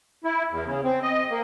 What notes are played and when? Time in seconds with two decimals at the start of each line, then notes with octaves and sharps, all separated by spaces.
0.24 E4
0.50 E2
0.65 C#3
0.84 C4
1.03 D#5
1.30 A#3